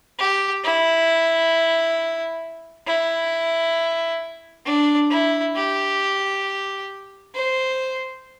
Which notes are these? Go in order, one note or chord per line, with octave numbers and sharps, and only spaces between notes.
G4
E4
E4
D4
E4
G4
C5